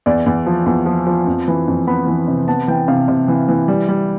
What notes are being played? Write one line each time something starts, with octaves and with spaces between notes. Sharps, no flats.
E2 D5
E2
F3
E2
F3
F3
F2
E3
F2
B3 B5
E3
C3
B3 A5
E3 G5
C3 F5
C3
E3
E3
G3
G3